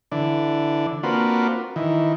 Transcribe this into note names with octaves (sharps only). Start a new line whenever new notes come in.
D3 E3 D4
A#3 C4 D4 F4 F#4 B4
D#3 E3